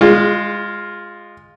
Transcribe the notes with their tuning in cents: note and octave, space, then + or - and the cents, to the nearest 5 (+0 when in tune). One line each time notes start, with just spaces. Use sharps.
G#3 -15 F4 +5